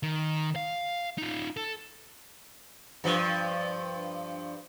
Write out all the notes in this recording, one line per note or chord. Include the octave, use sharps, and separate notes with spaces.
D#3
F5
D#4 F4
A4
G2 F3